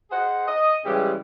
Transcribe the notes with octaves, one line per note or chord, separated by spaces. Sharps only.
G#4 C5 D#5 F#5
D#5
C#3 E3 G3 G#3 G4